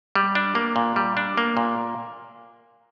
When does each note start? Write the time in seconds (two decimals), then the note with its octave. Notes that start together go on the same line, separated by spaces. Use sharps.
0.15 G3
0.35 D4
0.55 A#3
0.76 A#2
0.96 G3
1.17 D4
1.38 A#3
1.57 A#2